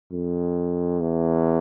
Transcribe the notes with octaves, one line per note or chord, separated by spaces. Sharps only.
F2
E2